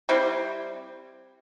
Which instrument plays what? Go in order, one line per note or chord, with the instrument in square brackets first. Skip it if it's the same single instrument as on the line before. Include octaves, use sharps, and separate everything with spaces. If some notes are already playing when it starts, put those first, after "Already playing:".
[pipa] G3 C4 E4